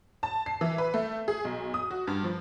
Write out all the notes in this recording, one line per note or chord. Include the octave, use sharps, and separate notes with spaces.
A5
C7
E3
B4
A3
G#4
B1
D#6
F#4
G2
F3